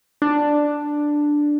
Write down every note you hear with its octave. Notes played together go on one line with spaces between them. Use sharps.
D4